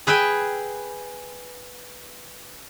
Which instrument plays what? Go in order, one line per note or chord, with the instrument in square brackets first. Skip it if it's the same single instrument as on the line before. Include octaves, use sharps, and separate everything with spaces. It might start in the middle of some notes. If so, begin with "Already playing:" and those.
[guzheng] G#4 B4 E5 G5 G#5